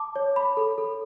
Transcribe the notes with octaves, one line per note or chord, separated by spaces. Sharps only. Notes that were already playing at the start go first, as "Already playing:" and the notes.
Already playing: A5 D6
C#5
B5
A4
A4